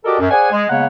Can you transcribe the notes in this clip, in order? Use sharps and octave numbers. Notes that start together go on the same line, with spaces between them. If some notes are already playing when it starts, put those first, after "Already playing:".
F#4 G4 A4 A#4 D5 D#5
F#2
G#4 C5 D5 F#5 G#5
G#3
C#3 G#3 A#3 B3 C#5 F#5